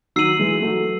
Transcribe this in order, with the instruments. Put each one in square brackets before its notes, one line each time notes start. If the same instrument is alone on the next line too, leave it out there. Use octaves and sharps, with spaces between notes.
[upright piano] D#3 F#3 [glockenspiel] E6 C7 D#7 F#7
[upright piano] E3 G#3
F#3 A3